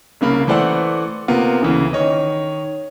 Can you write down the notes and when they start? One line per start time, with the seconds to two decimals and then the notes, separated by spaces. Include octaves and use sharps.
0.21 C2 C#3 A#3 B5
0.47 E3 A3 C5 D5 F#5 E6
1.28 C3 A#3 B3 F4
1.62 D2 C#3 E3
1.93 D#3 C#5 D#5